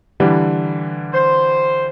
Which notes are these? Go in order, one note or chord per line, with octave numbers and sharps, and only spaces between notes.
D3 E3 G3
C5